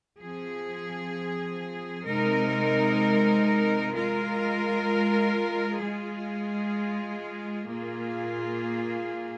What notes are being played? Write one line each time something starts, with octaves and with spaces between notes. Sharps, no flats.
F3 C4 G#4
C3 G#3 D#4 A#4
G#3 F4 A#4
G#3 F4 G#4
A#2 A#3 F4 G#4